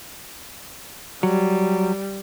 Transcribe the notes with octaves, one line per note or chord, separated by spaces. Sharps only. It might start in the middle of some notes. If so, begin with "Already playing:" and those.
F#3 G3